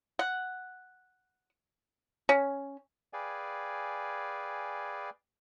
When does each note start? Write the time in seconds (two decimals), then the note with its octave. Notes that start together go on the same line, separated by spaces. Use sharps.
0.19 F#5
2.29 C#4
3.13 G#4 B4 D5 F5 G5 G#5